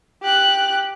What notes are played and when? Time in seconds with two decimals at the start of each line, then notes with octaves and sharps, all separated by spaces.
0.22 G4 F#6